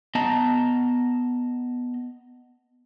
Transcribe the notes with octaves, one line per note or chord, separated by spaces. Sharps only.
B3 D#5 A5 A#5